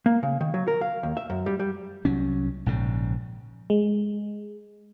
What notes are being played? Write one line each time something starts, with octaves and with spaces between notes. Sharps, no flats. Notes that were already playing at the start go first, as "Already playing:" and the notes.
A#3
C#3
D#3
F#3
A#4
F5
D#2
E5
F#2
G3
G3
C2 F#3 C#4
A#1 G#2 C#3
G#3